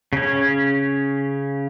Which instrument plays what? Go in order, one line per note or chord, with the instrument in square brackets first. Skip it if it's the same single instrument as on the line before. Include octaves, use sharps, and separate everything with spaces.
[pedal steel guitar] C#3 C#4